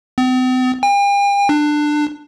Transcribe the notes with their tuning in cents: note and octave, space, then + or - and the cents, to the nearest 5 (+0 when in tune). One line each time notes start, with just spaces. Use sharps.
C4 -45
G5 +45
D4 +20